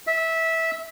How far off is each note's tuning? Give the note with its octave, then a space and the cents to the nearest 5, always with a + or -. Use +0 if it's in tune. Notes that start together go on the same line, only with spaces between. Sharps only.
E5 -15